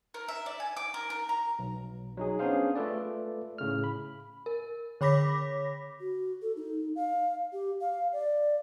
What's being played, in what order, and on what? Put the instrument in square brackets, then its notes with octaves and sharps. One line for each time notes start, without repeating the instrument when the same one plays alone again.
[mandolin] A#4
E5
D5
G#5
D6
A#4
A#4
A#5
[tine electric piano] B1
F#3 D#4 G#4
B3 C#4 D4 G#4 C5 F5
A3 F4 A4 B4 D5
A2 C#3 F6
B5
[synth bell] A#4
D3 C#5 B5 D6 A#6 B6
[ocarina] F#4
A4
D#4
F5
G4
F5
D5